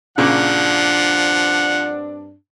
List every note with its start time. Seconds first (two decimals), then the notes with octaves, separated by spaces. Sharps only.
0.18 G2 A#2 C#3 F3 C4 D4 F#5